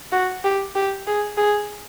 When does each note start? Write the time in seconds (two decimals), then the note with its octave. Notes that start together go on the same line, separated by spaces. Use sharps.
0.12 F#4
0.44 G4
0.75 G4
1.07 G#4
1.37 G#4